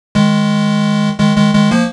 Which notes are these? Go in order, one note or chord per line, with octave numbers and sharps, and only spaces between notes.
D#3 G#3
D#3 G#3
D#3 G#3
D#3 G#3
F3 A#3